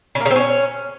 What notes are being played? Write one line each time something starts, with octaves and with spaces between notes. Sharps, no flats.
C#3
A#3
C#3
C4
C#4